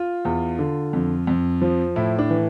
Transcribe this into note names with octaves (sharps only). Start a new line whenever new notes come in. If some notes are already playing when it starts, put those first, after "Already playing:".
Already playing: F4
E2
D3
F2
F2
F3
A2 E4
D4
E3